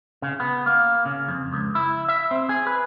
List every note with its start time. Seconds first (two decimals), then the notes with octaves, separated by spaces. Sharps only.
0.22 C#3
0.40 B3
0.66 A#3
1.06 C#3
1.28 F2
1.52 C#2
1.75 E4
2.09 E5
2.31 C4
2.49 G#4
2.67 B4